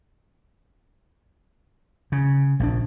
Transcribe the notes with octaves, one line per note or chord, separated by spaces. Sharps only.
C#3
A#1 D#3 D4